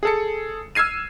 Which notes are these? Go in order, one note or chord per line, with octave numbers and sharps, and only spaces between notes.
G#4 A4 C#7
E6 F6 G#6 C7 D#7